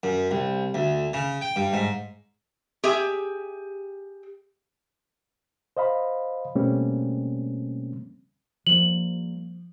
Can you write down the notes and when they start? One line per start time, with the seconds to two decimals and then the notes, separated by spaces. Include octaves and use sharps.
0.03 F#2
0.31 C2
0.74 D2
1.14 C#3
1.41 G5
1.56 G2
1.73 G#2
2.84 G4 G#4 E5
5.77 C5 D#5 F5 B5
6.55 B2 G3 A3 A#3 C4 C#4
8.67 F3 G3 A#3 F#7